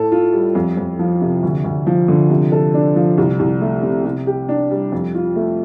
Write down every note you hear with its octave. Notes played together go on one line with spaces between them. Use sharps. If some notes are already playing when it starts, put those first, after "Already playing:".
Already playing: A2 A4
F4
G3
F2
F2
F3
C3
D2
D2
F3
D3
C3
A4
D4
F3
C2
C2
A3
C3
C3
G4
D4
G3
F2
F4
A3